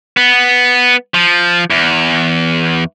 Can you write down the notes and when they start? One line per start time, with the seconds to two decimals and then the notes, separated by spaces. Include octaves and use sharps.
0.17 B3
1.14 F3
1.70 E2